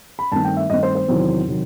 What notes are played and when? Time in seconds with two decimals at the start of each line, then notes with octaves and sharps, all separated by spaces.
0.19 B5
0.32 G2 D#3 A3 C4 A5
0.44 G5
0.57 E5
0.70 G2 D#3 A3 C4 D#5
0.83 C5
0.95 C5
1.08 E2 C3 D#3 F#3 C4
1.47 C3 D#3 F#3